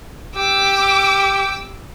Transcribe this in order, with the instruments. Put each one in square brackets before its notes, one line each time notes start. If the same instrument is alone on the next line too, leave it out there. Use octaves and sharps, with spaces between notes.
[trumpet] G4 [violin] D6 E6